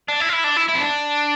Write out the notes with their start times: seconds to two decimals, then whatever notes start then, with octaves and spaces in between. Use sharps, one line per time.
0.08 D4
0.20 E4
0.29 F4
0.33 E4
0.44 D4
0.57 E4
0.69 E4
0.75 C4
0.81 D4